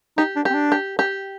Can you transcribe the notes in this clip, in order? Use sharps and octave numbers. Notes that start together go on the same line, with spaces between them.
D#4 G4
D4
C4 G4
D4
G4
G4